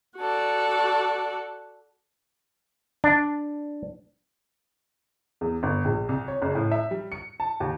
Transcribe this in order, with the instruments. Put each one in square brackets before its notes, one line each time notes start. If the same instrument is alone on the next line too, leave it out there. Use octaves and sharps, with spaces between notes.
[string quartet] F#4 A4 D5
[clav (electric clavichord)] D4
[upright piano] E2
G1
A#1
C2
C#5
F#1
A2
E5
G3
C#7
A5
D#2